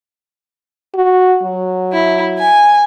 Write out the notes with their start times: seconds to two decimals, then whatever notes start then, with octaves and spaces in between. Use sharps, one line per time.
0.95 F#4
1.43 F#3
1.93 E4
2.38 G#5